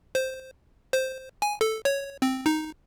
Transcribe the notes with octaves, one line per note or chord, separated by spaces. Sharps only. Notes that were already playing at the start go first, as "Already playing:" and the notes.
C5
C5
G#5
A4
C#5
C4
D#4